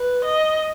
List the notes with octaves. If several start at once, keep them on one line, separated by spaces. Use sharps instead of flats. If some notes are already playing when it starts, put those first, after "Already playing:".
Already playing: B4
D#5